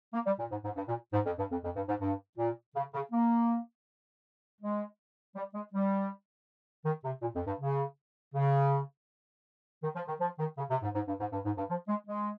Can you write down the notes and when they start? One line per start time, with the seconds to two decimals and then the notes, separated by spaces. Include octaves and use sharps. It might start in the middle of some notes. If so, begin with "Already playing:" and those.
0.14 A#3
0.26 G3
0.39 A#2
0.51 G#2
0.64 G#2
0.76 G2
0.88 A#2
1.13 G#2
1.26 F2
1.38 G2
1.51 F2
1.63 F2
1.76 G2
1.88 G#2
2.00 G2
2.38 A#2
2.75 C#3
2.94 C#3
3.12 A#3
4.61 G#3
5.36 G3
5.54 G#3
5.73 G3
6.85 D#3
7.04 C3
7.22 A#2
7.35 F2
7.47 G2
7.60 C#3
8.34 C#3
9.83 D#3
9.96 F3
10.08 D#3
10.20 F3
10.39 D#3
10.58 C#3
10.70 C3
10.83 G#2
10.95 G#2
11.08 G2
11.20 G#2
11.32 G2
11.45 G#2
11.57 G2
11.69 F3
11.88 G#3
12.07 G#3